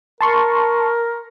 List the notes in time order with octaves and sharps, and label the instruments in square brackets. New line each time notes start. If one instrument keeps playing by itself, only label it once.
[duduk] A#4 [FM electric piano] A5 C6 C#6